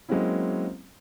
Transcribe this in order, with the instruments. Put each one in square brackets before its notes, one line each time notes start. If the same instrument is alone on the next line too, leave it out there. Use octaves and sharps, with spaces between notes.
[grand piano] F#3 G#3 A#3 C4 C#4 E4